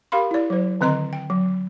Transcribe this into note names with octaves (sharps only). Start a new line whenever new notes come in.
G4 A#4 F5 B5 C6
E4 D5
F#3 C5
D3 D#3 C4 D#5 A#5 C6
G5
F#3